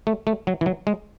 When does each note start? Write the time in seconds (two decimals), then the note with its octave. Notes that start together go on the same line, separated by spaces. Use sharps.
0.07 A3
0.27 A3
0.47 F#3
0.61 E3
0.66 F#3
0.87 G#3